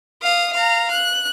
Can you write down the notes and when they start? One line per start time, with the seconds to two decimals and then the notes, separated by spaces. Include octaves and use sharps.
0.22 F5 D#6
0.53 F5 A#5
0.91 F#6